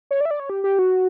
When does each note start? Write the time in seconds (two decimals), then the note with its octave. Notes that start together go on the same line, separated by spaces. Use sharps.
0.11 C#5
0.21 D5
0.25 E5
0.31 D5
0.40 C#5
0.50 G4
0.64 G4
0.79 F#4